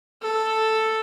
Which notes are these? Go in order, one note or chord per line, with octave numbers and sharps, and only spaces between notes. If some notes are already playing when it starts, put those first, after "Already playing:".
A4